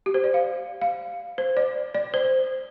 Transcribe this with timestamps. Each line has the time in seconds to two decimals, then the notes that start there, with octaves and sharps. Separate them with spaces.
0.06 G4
0.14 C5
0.24 D5
0.34 F5
0.82 F5
1.38 C5
1.57 D5
1.95 D5
2.14 C5